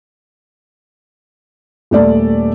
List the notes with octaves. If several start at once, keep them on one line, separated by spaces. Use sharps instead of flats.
D#1 A3 D5